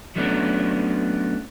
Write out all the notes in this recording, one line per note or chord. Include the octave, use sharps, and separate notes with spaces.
F#3 A3 B3 C#4 D4